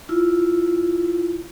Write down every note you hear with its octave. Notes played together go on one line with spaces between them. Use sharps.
E4 F4